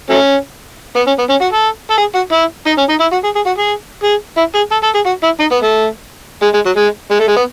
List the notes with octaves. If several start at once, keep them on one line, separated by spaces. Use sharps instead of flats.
F#3 A3 C#4
B3
C#4
B3
C#4
F#4
A4
A4
G#4
F#4
E4
D#4
C#4
D#4
E4
F#4
G#4
G#4
F#4
G#4
G#4
E4
G#4
A4
A4
G#4
F#4
E4
D#4
B3
A3
G#3
G#3
F#3
G#3
G#3
A3
G#3
B3